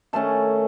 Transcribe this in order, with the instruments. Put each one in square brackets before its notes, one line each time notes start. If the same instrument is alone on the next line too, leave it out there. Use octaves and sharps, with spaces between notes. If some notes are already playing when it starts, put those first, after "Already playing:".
[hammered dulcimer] D#3 A3 C#4 A5